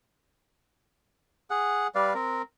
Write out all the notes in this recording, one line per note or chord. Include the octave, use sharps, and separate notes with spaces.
G#4 F#5
G3 B4 D5 F5
C4 A#4